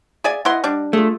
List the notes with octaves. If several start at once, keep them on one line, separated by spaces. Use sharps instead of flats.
G#4 D5 E5 F5 G#5
E4 B4 D#5 F#5 C6
G3 D4
A3 F4 G#4